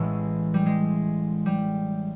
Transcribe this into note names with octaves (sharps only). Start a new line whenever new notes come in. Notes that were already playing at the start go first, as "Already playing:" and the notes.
Already playing: A1 A2 E3 G#3
G3
G#3
G3